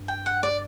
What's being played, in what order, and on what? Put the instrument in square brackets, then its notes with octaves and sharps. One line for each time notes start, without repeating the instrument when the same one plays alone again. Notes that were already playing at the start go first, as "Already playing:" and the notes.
Already playing: [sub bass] G2
[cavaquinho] G5
F#5
D5